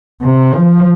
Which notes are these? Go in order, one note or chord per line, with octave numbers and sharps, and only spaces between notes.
C3
F3